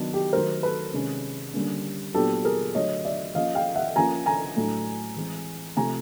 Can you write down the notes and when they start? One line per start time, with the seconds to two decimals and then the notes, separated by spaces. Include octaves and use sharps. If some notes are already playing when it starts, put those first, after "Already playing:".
Already playing: D#3 F#3 B3 D4
0.14 G4
0.33 D#3 F#3 A3 A#4 C5
0.63 A4 B4
0.94 C3 D#3 G#3 C#4
1.54 D3 G3 A#3 C#4
2.14 A#2 F#3 B3 D4 G4 A4
2.45 G#4 A#4
2.74 D3 F#3 A3 C#5 D#5
3.05 D5 E5
3.35 F3 A#3 C#4 D#5 F5
3.55 F5 G5
3.76 E5 F#5
3.96 F3 A#3 C#4 G#5 A#5
4.26 G#5 A#5
4.56 A2 F#3 A3 D4
5.16 E3 G#3 C4
5.77 C3 F3 A3 G#5 A#5